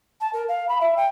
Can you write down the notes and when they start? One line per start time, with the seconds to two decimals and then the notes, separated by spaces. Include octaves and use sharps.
0.20 A5
0.33 A#4
0.48 F5
0.68 B5
0.80 E5
0.97 G5